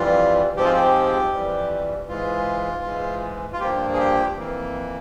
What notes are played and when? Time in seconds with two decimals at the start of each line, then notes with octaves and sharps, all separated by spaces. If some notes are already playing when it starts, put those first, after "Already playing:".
Already playing: F2 E3 G3 F4
0.56 G#2 F3 G#3 C4 G4
0.65 F4
0.73 G4
1.32 F2 E3 G3
2.08 G#2 E3 G#3 F4
2.84 G#2 E3 G#3
3.53 F4
3.60 G2 F3 A#3 G4
3.93 G#4
3.99 G4
4.37 F2 E3 A#3